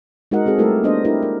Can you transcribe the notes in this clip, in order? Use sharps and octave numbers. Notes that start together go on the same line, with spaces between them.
G#3 D#4 F#4 A#4 D#5 F#5
G#3 C4 F#4 G#4 A4
G3 A3 E4 G4 A4 A#4
A#3 B3 D4 C5 D#5
D4 E4 G4 A#4
A#4